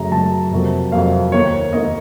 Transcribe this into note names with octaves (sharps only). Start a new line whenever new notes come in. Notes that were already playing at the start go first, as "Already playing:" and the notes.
Already playing: F#2 C#3 F#3 A3 A#5
F#2 C#3 F#3 A3 A5
F2 C3 F#3 A#3
F2 C3 F#3 A#3 F5
D#2 D#3 A#3 C#5
D#2 D#3 A#3 D#5